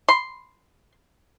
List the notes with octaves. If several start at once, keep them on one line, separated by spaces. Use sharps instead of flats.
C6